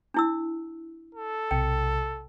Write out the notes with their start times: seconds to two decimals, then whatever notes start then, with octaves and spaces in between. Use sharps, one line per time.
0.14 D4 E4 E6
1.15 A4
1.51 B1 C3 G5